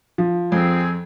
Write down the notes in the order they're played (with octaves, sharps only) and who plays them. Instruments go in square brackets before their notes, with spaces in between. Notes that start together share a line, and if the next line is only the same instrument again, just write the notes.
[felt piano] F3
[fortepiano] F2 [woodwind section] C4 G#4